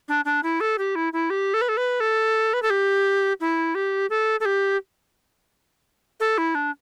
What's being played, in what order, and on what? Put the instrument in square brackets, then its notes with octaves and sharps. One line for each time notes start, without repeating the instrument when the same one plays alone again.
[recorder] D4
D4
E4
A4
G4
E4
E4
G4
A4
B4
A4
B4
A4
B4
A4
G4
E4
G4
A4
A4
G4
A4
E4
D4